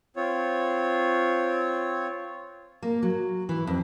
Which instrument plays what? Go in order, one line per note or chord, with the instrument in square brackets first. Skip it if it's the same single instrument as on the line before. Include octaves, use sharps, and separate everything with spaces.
[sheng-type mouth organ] C4 F4 C#5
[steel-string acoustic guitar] A#3
F#3
E3
F2